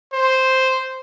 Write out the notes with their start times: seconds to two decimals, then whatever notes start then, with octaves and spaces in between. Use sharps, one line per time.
0.13 C5